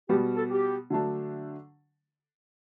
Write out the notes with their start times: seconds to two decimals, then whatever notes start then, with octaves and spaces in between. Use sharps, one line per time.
0.09 B2 G3 B3 G4
0.36 A4
0.50 G4
0.90 D3 F#3 A3 D4